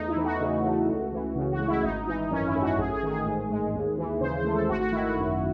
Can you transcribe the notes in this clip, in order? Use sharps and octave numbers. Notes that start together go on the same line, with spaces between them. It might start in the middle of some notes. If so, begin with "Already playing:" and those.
Already playing: E2 A3 D#4
E4
E3
F#4
C#3
A3
C#2
E3
C#3
F#4
G#3
E4
G#1 D#4
E3 D#4
F#2 C#4
E4
A3
F#4
A1 G#4
G#4
D#3
G#4
G#2
G#3
D#2
E3
C#3 C5
C5
A3
A4
G#1 F#4
F#4
D#3 E4
F#4
F#2